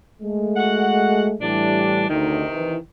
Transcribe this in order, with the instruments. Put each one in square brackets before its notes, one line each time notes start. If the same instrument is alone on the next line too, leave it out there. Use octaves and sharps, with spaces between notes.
[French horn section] G#3 A3
[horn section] F#4 F#5
[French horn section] A2 E3 G3 [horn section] D4
[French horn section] D2 D#4 [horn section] C3 D#3
[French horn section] E3